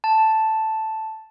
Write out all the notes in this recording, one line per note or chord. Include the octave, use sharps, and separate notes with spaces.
A5